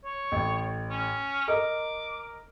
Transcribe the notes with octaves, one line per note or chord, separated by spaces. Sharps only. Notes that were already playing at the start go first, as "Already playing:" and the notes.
C#5
A1
C#4
A#4 D#5 A#5 D6